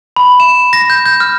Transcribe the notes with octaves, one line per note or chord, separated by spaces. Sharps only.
B5
E7
A#6
G6
G6
F6